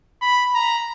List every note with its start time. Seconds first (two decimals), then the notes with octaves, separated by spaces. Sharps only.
0.21 B5
0.55 A#5